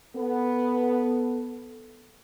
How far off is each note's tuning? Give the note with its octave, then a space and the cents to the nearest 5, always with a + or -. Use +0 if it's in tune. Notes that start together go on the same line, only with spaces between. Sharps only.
B3 +0 A4 +0